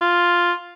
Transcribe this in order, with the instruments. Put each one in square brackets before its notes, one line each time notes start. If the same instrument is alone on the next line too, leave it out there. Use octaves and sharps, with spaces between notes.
[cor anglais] F4